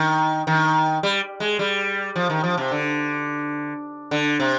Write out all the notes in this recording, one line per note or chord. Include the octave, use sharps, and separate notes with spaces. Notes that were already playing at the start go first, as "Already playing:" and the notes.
Already playing: D#3
D#3
G3
G#3
G3
F3
D#3
F3
C3
D3
D3
C3